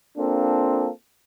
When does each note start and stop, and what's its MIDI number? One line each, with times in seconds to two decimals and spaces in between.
0.17 0.89 58
0.17 0.89 60
0.17 0.89 62
0.17 0.89 65
0.17 0.89 69